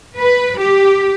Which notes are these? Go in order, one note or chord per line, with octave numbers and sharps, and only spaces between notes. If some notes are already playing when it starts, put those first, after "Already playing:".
B4
G4